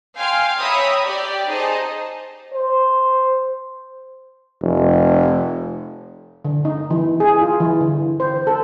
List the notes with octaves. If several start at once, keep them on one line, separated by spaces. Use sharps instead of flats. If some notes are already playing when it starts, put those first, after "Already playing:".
F5 G5 G#5 C6
C#5 E5 G5 A#5 B5 D#6
G4 D5
D#4 G#4 C5 D#5 A5
C5
F1
D3
D#4
E3
G#4
F4
E3
D3
C5
A4